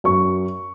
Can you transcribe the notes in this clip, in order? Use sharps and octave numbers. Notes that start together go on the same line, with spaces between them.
F#2 C#6